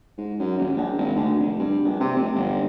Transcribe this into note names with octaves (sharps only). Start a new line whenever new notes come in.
G#2
F#2
D#1
A#1
G#1
D2
F1
G2
A#1
C3
F1
G1